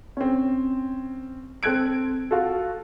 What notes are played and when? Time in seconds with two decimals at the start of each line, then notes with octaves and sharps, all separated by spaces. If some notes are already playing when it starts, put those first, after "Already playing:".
0.17 C4 C#4
1.63 C4 A4 F#6 G#6 D7
2.31 F4 F#4 A4